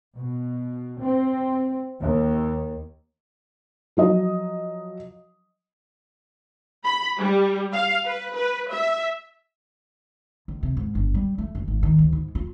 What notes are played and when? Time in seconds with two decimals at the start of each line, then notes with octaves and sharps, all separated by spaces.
0.15 B2
1.00 C4
1.99 D#2
3.97 F3 F#3 D#5
6.84 B5
7.17 G3
7.73 F5
8.05 B4
8.35 B4
8.71 E5
10.48 C#2
10.63 C3
10.77 G#2
10.95 G1
11.14 G3
11.38 A3
11.55 F#1
11.68 G#1
11.83 D#3
11.98 D2
12.12 G#2
12.35 F4